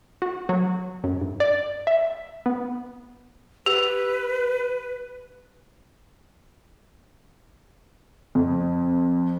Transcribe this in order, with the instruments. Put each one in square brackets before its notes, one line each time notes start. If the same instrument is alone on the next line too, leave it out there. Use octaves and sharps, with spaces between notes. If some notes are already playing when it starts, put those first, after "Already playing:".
[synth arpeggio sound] F#4
F#3
F#2
G2
D5
E5
B3
[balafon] G4 [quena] B4
[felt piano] F2